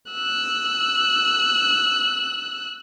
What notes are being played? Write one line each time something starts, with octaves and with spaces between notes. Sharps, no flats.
E6 F#6